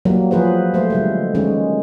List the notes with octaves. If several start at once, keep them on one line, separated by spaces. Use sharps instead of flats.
F#3 G3 A#3
F3 G#4 B4 C5
A3 C5
D3 G3 G#3
D#3 G#3 C#4